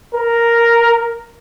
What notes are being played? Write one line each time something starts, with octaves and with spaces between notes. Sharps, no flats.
A#4